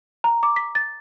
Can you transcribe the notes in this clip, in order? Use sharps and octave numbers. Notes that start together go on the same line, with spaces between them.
A#5
D6
B6
A6